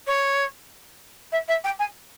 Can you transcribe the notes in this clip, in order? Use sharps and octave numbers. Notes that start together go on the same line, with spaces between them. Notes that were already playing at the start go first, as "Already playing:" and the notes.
C#5
E5
E5
G5
G#5